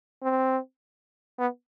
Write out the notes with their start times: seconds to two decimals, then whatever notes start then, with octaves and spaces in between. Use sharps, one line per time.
0.22 C4
1.39 B3